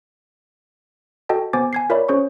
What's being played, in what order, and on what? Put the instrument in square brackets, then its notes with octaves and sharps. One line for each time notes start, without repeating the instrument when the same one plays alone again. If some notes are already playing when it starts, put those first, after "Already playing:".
[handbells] F#4 A4 D#5 G5 A5
B3 C5 G#5 D6 A6
G#5 G#6 C7
F4 A#4 C#5 D5 E5 B5
C#4 G#4 C5 C#5 C#6